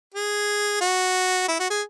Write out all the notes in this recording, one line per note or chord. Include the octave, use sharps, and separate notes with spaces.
G#4
F#4
E4
F#4
G#4